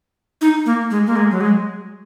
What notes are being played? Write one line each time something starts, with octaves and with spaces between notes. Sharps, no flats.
D#4
A#3
G#3
A#3
G#3
F#3
G#3